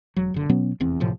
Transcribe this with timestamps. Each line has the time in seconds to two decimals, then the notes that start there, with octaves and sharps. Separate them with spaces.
0.16 E1 F#3
0.34 F#1 D3
0.49 B2 F#3 B3 C#4
0.80 F1 E2 C4
1.00 F#1 A2 C3 F3